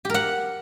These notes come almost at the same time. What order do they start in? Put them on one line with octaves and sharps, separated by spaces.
G4 A#4 F#5